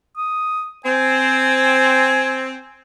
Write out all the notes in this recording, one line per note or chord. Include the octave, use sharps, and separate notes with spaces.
D#6
C4 G#5